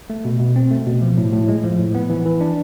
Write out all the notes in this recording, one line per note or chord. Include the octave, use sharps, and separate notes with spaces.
A3
B2
B2
C4
A3
B2
F3
A2
A2
G#3
F3
A2
B3
E3
E3
D4